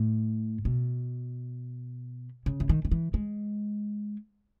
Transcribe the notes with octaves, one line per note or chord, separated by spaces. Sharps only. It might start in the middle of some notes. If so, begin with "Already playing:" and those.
Already playing: A2
B2
C#3
E3
D#3
D#3
E3
G#3